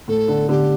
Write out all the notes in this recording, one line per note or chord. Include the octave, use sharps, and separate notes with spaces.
A2 A4
D3
D3 G4